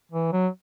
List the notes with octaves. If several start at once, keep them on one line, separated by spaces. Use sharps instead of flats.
E3
F#3